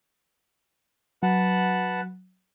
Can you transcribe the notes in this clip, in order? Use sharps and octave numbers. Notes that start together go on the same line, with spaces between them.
F#3 B4 F#5 A5